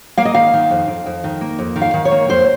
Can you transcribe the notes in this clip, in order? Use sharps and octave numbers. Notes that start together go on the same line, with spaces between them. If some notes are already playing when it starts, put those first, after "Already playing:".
A#3 F5
D#5
D#3 F5
D#3
F2
F2
F2
D#3
A#3
F2
D#3
F5
D#3
C#5
A#3
F2 C5